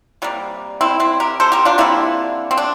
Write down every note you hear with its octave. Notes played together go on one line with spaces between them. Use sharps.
C3 G3 A#3
C4 E4
C4 E4
G4 A#4
A4 C5
G4 A#4
D4 F4
D3 G3 A#3 C4 E4
C4
D4